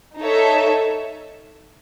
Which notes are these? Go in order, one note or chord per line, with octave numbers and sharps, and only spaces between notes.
D#4 A4 C#5 E5